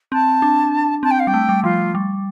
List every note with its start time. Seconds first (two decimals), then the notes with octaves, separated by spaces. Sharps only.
0.12 C4 A5
0.42 D4
1.03 C4 A5
1.11 G5
1.20 F5
1.27 G3 G5
1.34 A3
1.49 G3
1.64 F3 F4
1.95 G3